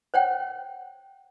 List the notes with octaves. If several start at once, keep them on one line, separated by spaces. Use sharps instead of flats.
C5 C#5 F#5 G5